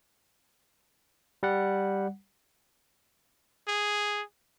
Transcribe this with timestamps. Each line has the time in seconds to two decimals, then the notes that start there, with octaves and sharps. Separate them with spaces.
1.43 G3 F#5
3.68 G#4